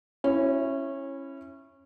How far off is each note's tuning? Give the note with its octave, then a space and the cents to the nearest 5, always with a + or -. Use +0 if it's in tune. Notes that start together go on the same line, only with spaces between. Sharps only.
C#4 -20 E4 +10